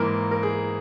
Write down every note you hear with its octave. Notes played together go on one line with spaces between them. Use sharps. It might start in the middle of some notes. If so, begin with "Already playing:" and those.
Already playing: G#2 E3 A#3 A#4
A#4
G#4